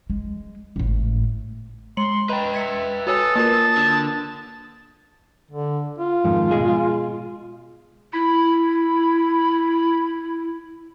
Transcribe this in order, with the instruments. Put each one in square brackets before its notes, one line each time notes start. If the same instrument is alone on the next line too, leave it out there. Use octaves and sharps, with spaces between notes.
[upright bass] G#3
G#1 A2
[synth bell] G#3 C#7 F#7 [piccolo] C6
[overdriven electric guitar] B4 G5 [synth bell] D#5 B5 [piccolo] A#5
[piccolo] E5 [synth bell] G#6 B6 C#7
[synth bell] F#4 C#5 G#5 [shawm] A4 [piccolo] D#6
[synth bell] A#3 F4 A#4 [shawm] A5
[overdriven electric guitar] D3
[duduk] D3
F4
[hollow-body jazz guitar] F2 G#2 D#3
B2 G#3 G#4
[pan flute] E4 [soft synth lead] B5